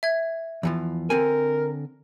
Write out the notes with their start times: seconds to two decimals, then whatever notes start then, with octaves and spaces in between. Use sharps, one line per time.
0.03 E5 G#6
0.63 E2 E3 F3
1.10 D3 C4 A#4 G#5